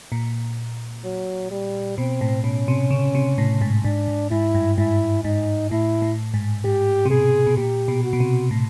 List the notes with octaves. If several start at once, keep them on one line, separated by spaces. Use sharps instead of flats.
A#2
F#3
G3
B2 C4
A2
B2 C#4
C3
C#3
C3
A2
G#2
G#2 D4
G#2
G#2 E4
G2
G#2 E4
G#2 D#4
A2 E4
A2
G#2
G#2 G4
C3
B2 G#4
B2
A#2 G4
B2
F#4
B2
C3
A2